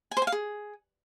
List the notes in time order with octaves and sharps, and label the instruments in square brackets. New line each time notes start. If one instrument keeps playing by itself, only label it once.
[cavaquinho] G#5
C5
G#5
F5
G#4